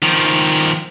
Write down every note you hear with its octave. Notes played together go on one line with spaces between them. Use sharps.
D#3 F3